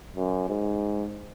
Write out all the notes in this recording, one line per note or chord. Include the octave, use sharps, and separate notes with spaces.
F#2
G#2